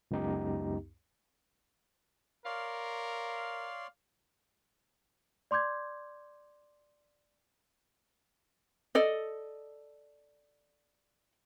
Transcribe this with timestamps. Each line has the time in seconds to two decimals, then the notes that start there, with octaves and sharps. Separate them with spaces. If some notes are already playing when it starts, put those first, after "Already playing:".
0.11 C#2 F#2 B3 D#4 G4
2.45 A#4 C#5 D5 F5 C6
5.51 D5 C6 D6 G6 G#6
8.95 A4 D5 D#5